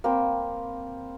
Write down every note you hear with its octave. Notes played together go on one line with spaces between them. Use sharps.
A#3 C4 B5